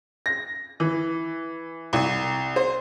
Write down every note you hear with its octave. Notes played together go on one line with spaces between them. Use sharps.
A#6
E3
C2
C5